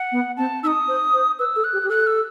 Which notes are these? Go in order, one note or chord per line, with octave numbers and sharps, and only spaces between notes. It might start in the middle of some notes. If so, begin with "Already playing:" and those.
Already playing: F#5
B3
C4 A5
D#4 E6
D#6
C5
C5
B4 E6
A4
F#6
G4
G4
A4 F#6
E6